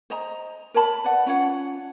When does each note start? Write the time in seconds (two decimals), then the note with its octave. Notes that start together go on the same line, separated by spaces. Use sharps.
0.10 C5 D#5 A#5
0.74 A#4 C#5 A5 B5
1.04 B4 D5 F#5
1.26 C#4 F4 C#5 F#5